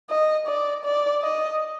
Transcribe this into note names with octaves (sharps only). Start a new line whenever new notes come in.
D#5
D5
D5
D#5